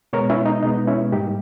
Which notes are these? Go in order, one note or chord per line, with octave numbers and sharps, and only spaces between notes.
B2 G#3 B3 A#4 C#5
C#4 E4
D#4
B2 G#3 B3 D#4
C#4 E4
G#2 G3 A#3 D#4 G4